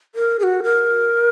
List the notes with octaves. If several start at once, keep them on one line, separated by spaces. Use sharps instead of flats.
A#4
G#4
F#4
A#4